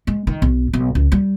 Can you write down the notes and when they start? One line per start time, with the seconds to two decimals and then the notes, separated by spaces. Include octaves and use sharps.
0.07 G#3
0.27 D#3
0.42 B1
0.73 B1
0.95 C#2
1.12 G3